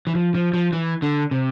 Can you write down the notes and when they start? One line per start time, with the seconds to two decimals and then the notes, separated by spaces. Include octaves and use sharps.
0.07 E3
0.15 F3
0.35 F3
0.54 F3
0.73 E3
1.02 D3
1.31 C3